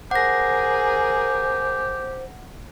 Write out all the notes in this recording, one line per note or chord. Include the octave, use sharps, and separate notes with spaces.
G4 G#4 A#4 C5 F#5 A#6